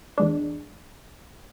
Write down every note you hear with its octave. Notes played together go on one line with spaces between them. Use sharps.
E2 G#3 D4